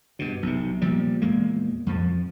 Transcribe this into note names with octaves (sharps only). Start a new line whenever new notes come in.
G2 B2
B1 C3
A#2 F3 G3
E2 A#2 G#3 A#3
F2 F3